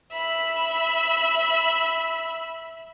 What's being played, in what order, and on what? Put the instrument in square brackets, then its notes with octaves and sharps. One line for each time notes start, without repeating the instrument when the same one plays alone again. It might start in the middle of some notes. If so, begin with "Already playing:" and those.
[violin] E5 B5